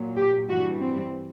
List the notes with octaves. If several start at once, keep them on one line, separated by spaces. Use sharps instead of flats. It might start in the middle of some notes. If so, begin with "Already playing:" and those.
Already playing: A#2 F#3
G4
G2 E3 G3 F#4
C4